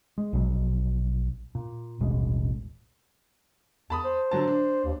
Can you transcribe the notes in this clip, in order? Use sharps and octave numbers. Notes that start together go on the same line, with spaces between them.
G#3
A#1 B2 F#3
A#2
D#1 A1 B2 G#3
E2 A5 B5 D#6
C5
D3 F#3 A5
D4
D#2